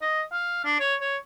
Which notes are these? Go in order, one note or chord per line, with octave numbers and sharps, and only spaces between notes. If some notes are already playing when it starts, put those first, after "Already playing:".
D#5
F5
D4
C#5
C#5